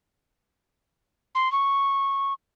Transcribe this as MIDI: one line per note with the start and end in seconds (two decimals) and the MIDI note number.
1.35 1.51 84
1.52 2.33 85